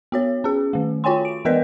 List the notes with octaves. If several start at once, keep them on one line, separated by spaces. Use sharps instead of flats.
B3 F#4 C#5
C#4 G#4
D#3 A3
F4 F#4 C#5 G5 G#5 C6
D7
E3 B3 A#4 B4 D5 D#5